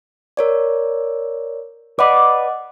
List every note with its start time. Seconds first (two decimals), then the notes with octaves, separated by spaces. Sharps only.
0.37 A#4 C#5 D5
1.99 B4 D5 D#5 F#5 D6